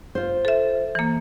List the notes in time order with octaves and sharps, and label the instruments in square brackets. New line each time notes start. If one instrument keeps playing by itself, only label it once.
[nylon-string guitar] F4 C5
[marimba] A4 E5
E3 A#3